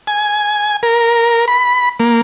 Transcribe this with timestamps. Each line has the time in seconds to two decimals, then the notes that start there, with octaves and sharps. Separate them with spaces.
0.07 G#5
0.83 A#4
1.48 B5
2.00 A#3